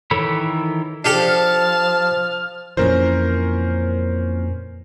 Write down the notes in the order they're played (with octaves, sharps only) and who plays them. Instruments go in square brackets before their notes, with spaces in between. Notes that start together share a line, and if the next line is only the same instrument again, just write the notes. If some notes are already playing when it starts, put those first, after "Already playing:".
[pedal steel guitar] D#3 E3 A4 C#5 B5
[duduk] F3 [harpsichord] D4 G4 A4 [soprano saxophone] A5 [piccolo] F6
[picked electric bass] F2 A#2 E3 [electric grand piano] C#4 A#4 C5